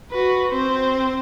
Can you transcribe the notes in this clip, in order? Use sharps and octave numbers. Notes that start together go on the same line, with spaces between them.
F#4 B4
C4 C5